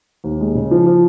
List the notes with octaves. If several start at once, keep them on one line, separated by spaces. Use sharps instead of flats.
D#2
G#3
C#3
F3
F3